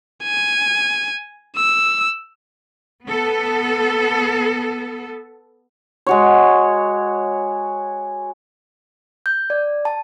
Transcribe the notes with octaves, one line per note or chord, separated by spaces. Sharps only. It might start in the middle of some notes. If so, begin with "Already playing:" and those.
G#5
E6
B3 A4
G#3 F#4 C#5
G6
D5
A5